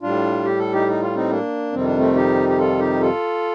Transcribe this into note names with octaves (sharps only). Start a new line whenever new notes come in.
A2 G3 D4 F4
G4
A4
D#4 G4
D#4
F4
C4 D#4
A#3 D4
F2 C3 D#3 G3 C4
D4
A3 C4
D#4 G4
G4
F4 A4
D#4 G4
F4 A4